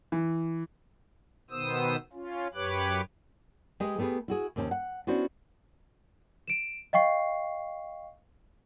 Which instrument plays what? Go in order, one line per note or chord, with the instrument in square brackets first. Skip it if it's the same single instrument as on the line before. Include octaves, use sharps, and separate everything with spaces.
[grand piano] E3
[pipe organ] B2 D#3 B3 C5 D#6 E6
C#4 F4
F#2 G4 B4 C#5 D6 F#6
[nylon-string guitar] G#3 G4 G#4 B4 D#5
A3 B3 G4 G#4 B4
E4 F#4 G#4
D#2 C3 C#4 C5 A5
F#5
B3 C#4 D4 E4 F#4 C5
[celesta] D7 E7
D#5 F5 G5 C#6 C7